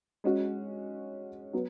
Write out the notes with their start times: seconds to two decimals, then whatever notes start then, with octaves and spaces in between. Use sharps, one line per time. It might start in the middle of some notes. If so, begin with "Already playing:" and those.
0.24 G#3 C#4 F#4
1.53 F#3 B3